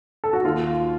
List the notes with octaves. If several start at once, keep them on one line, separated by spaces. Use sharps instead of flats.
A4
F#4
D#2 F4